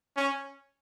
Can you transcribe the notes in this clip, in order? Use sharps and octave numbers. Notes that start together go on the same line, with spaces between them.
C#4